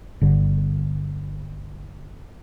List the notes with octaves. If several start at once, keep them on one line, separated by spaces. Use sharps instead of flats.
G1 D3